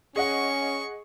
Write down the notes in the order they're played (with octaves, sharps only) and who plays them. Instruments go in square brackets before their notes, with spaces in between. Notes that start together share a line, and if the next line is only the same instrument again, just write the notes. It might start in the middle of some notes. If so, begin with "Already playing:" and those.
[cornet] C#4 [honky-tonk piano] G#4 D#5 F#5 [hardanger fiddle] C#6